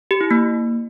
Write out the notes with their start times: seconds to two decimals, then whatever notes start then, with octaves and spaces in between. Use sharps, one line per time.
0.11 G4
0.21 E4
0.31 A#3